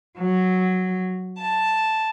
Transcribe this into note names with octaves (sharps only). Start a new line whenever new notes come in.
F#3
A5